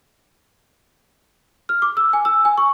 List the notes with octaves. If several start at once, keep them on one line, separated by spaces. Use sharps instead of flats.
F6
D6
E6
G#5
E6
G#5
C#6